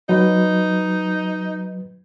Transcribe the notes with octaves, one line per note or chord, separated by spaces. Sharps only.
F#3 D#4 B4